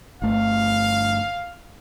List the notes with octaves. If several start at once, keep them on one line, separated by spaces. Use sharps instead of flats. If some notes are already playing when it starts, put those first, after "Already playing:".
G1 A3 F5